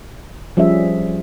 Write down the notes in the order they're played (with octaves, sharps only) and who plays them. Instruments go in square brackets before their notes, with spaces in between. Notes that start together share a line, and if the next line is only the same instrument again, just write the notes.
[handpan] F3 G3 C#4 G#4 E5